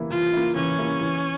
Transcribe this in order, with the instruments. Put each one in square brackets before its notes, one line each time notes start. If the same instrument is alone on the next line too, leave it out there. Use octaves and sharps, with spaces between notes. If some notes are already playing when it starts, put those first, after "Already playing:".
Already playing: [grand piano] E3 A#3 E4
[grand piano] E3 [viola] F4
[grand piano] A#3 E4
[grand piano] E3 [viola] C#4
[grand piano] A#3 E4
E3